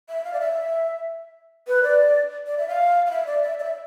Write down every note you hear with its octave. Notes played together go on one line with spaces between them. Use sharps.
E5
F5
D5
E5
B4
D5
D5
E5
F5
F5
E5
D5
E5
D5
E5